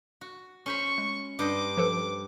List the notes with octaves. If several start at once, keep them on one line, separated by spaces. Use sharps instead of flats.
F#4
C#4 C5 B5 C#6
G#3
G2 C5 D#5 D6
F3 A4 B4